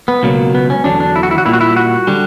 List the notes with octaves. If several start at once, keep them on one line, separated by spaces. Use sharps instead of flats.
B3
C#2 B2 F#3 A#3
B3
C#4
E2 D3 F#3 D4
D4
E4
F#4
E4
F#4
A#2 G3 E4
F#4
E4
F#4
D3 G3